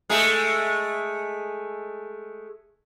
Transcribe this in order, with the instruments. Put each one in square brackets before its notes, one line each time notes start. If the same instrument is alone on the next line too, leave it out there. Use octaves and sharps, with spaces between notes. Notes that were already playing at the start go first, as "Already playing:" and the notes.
[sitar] G#3 A3 G#4